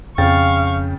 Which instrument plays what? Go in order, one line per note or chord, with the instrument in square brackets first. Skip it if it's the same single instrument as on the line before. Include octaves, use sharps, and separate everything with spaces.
[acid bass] F2 [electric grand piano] C#3 G5 A6 [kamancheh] F5 C#6